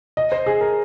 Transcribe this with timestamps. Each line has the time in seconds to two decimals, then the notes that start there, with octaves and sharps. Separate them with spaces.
0.17 D#5
0.32 C5
0.46 G#4
0.61 A#4